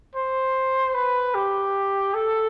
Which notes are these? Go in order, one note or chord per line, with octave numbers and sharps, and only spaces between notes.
C5
B4
G4
A4